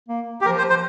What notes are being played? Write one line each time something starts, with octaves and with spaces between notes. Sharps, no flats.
A#3
G4
F3 A#4
C5
C5